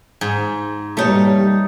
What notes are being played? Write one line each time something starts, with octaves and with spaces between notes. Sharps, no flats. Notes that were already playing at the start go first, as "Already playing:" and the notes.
G#2
B2 G3 A3 A#3 D#4 C#5